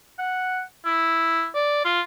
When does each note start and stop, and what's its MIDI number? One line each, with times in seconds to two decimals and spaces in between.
0.19 0.62 78
0.85 1.47 64
1.55 1.82 74
1.85 2.01 65